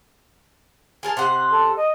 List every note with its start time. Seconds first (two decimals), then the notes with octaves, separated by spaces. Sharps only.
1.03 G#4 A#4 A5
1.17 C3 C5 F#5
1.51 A4
1.76 D#5